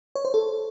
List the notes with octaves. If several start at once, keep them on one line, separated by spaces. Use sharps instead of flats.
C#5
C5
A4